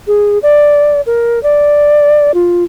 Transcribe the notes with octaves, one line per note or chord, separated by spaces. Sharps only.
G#4
D5
A#4
D5
F4